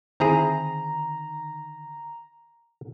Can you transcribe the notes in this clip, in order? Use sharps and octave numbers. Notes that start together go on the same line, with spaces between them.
D3 D#3 C4 E4 G#4 A#5